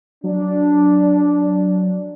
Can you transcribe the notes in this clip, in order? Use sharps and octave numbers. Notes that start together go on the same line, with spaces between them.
F#3 D4